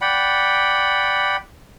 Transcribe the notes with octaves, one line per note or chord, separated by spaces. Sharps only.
D5 F#5 G5 B5